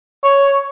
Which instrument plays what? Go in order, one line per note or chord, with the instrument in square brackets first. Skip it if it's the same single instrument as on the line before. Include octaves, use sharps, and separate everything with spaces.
[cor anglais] C#5